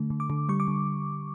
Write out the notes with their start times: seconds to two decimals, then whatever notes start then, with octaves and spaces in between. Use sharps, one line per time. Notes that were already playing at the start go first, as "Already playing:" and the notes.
Already playing: D3 A3
0.10 D3
0.20 D6
0.30 D3
0.49 G3 C#6
0.60 D6
0.68 D3